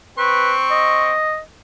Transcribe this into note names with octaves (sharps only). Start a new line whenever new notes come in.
C4 B4 C#6
D#5